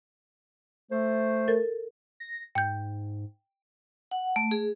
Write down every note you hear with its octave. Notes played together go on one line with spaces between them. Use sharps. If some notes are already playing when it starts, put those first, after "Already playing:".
A3 C5
A4 A#4 A6
A#6
G#2 G5 G6
F#5
A3
G#4